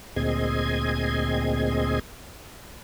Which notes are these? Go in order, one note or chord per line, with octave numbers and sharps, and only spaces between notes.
D2 A#2 C4 G#4 D#5 G#6